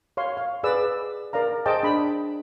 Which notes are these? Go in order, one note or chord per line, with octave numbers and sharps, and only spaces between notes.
C#5 F5 C6
F5
G#4 B4 D5 E6
A#4 D5 F5 A#5
G#4 C5 D#5 G5 A5 D6
D4 B5